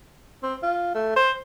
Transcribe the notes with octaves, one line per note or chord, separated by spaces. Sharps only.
C4
F4
A3
C5